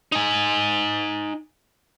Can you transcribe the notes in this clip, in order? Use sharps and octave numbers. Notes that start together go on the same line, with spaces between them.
D#4 G#5